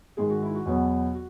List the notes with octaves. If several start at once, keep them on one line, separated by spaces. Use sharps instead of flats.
G#2 D#3 G#3 G#4
F#4
E4
F#4
E2 B2 F#3 B3
F#4